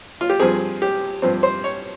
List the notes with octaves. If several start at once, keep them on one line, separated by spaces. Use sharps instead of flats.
F4
G4
G2 F3 C4 G#4
G4
G2 F3 C4
C5
C#5